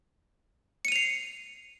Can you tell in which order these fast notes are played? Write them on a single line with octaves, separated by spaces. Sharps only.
C#7 D#7 F7 C7